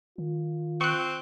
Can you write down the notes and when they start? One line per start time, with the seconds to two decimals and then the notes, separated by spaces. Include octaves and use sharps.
0.18 D#3 F4
0.81 C4 C#6 F#6